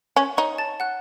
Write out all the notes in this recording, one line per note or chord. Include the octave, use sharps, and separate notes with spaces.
C#4
D#4 C#5 C#6
A5 A6
F#5 F#6